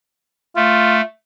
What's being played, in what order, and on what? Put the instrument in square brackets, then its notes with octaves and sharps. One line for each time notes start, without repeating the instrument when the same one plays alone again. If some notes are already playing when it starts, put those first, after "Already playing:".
[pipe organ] A3 [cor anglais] F4